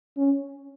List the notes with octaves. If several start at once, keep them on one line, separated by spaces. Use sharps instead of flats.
C#4